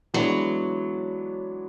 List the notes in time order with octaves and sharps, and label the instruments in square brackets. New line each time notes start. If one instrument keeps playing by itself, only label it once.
[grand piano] E3 G#3 B3 D4 [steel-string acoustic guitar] F#3